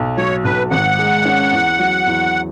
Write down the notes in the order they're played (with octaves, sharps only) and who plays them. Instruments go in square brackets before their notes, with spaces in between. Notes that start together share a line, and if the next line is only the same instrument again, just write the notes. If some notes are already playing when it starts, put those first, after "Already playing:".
Already playing: [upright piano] B1
[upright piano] F#3 [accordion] C#5
[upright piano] B1 [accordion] B4
[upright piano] G#1 [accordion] F#5
[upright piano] G#3
C#4
E2
F#3
E2